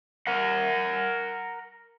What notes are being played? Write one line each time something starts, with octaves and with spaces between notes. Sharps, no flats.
A#4 F#5